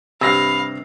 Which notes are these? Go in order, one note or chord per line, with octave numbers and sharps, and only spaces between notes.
G2 C3 F5 B5 E6 A#6 C7